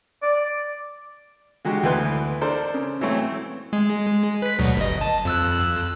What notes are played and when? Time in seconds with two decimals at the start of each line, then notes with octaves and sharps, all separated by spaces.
0.22 D5
1.65 D3 G#3 F#4 G4
1.83 D2 E3 B3 B4 C6 F#6
2.41 D4 A4 A#4 C5
2.74 C#3
3.01 E3 F#3 A3 C4
3.73 G#3
4.42 B4 B6
4.59 D2 B2 F#3
4.77 G1 D#5
5.01 A5
5.25 F2 E6 F#6